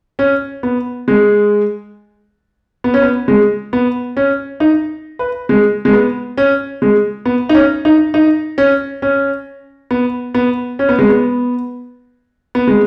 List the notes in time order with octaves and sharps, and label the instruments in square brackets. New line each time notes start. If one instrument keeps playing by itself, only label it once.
[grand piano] C#4
B3
G#3
B3
C#4
B3
G#3
B3
C#4
D#4
B4
G#3
G#3
B3
C#4
G#3
B3
D#4
C#4
D#4
D#4
C#4
C#4
B3
B3
C#4
B3
G#3
B3
B3
G#3